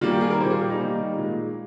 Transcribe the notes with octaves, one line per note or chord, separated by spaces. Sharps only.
D#3 G3 A#3 F4
G4
G#4
A#4
A#2 G3 A#3 C5
G#4
G4
D#4
D#3 G3 A#3
A#2 G#3